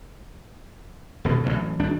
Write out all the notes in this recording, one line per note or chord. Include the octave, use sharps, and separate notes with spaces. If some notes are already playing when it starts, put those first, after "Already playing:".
D#1 G2 B2
A1 B2 E3 F#3
G#1 G3 D4